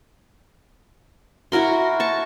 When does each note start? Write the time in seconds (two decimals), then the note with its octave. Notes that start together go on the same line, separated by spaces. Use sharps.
1.52 E4 F#4 A#4 C6
2.00 A5 C#6